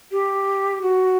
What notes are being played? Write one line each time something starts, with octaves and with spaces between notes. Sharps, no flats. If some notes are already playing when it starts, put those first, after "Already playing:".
G4
F#4